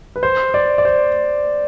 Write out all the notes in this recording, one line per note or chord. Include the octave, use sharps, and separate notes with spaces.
B4
C5
D5
D5
C5